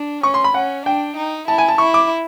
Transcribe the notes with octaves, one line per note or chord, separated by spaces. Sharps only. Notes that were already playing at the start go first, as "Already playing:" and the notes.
Already playing: D4
C#4 C#6
C6
B5
C#4 F#5
D4 G5
D#4
E4 A5
G#5
A5
E4 C#6
D6